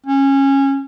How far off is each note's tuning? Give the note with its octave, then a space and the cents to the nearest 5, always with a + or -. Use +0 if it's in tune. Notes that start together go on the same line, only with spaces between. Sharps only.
C#4 -15